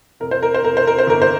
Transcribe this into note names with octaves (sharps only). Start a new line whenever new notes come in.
F1 A#4
C5
A#4
C5
F1 A#4
C5
A#4
C5
G1 A#4
C5